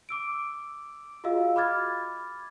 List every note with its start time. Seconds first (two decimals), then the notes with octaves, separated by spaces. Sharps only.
0.09 D6 E6 D7
1.24 F4 F#4 G#4 D#5 F5 E6
1.56 B5 D6 F6 G#6 A6